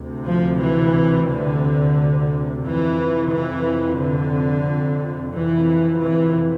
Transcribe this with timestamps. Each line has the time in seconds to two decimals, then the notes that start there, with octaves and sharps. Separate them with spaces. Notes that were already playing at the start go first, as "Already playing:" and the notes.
Already playing: D2 C3
0.25 F3
0.59 E3
1.27 D3
2.63 F2 C3 E3
3.30 E3
3.98 D3
5.33 F2 C3 E3
6.01 E3